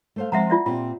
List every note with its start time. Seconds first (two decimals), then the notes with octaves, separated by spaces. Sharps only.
0.16 A3 C5 F5
0.32 F3 G#3 C4 E5 F#5 A#5
0.50 F4 D5 E5
0.66 A#2 C4 F4 G4